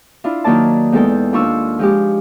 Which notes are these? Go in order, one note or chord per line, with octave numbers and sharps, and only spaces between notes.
D4 E4 F4
D#3 F#3 A#3 D5 A5
E2 G#3 A4 G5
D#2 D4 F4 C#6 E6
F3 G#3 G4